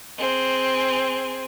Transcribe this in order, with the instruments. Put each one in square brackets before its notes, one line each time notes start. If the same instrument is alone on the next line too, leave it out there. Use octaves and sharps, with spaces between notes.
[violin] C4 G#4